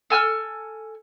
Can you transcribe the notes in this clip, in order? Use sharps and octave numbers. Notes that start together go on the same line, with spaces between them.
A4 G#5 E6 F6